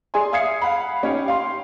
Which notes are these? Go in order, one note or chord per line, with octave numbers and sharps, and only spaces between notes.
G#4 D5 G#5 C6
E5 F5 D#6 G#6 C7 C#7
F5 F#5 B5
C#4 D#4 G4 C#5
G4 F5 C6